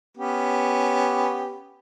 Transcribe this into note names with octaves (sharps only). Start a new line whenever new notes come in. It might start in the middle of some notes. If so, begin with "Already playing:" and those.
B3 C#4 G4